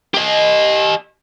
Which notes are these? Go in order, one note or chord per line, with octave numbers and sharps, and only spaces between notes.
G4 D#5